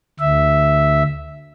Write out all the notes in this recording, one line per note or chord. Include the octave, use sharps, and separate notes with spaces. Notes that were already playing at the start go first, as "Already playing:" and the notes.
D2 E5